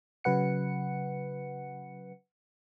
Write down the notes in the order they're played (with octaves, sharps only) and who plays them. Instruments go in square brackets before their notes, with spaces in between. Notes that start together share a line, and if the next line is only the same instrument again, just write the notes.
[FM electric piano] C#3 F#3 B4 F#5 C#7